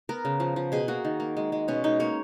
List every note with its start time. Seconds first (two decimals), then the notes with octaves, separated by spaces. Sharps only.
0.09 B3 A#4
0.25 C#3
0.40 F3
0.56 F3
0.72 B2 G#4
0.88 A#3 F#4
1.05 D#3
1.20 A#3
1.37 G#3
1.52 G#3
1.68 B2 C#4
1.84 G#3 D#4
2.00 A#3 C#5